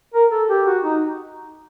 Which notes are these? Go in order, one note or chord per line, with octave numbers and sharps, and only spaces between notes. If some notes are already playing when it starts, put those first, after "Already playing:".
A#4
A4
G4
F#4
D#4